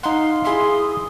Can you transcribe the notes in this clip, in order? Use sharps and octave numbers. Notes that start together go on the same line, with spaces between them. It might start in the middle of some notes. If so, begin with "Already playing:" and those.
D#4 F5 F#5 C6
E4 G#4 E5 C6
D#6